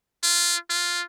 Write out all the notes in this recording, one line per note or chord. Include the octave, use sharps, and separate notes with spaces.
F4
F4